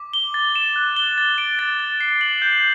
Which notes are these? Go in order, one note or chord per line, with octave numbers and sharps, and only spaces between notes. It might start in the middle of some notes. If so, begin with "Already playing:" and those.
Already playing: D6
G7
A6
E7
F#6
G7
A6
D7
A6
A6
C7
F#7
G6